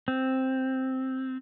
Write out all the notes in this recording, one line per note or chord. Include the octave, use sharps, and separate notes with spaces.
C4